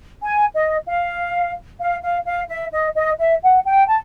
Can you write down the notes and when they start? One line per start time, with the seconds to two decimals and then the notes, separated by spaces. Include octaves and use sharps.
0.23 G#5
0.54 D#5
0.86 F5
1.79 F5
2.02 F5
2.25 F5
2.48 E5
2.71 D#5
2.95 D#5
3.18 E5
3.42 F#5
3.64 G5
3.87 A5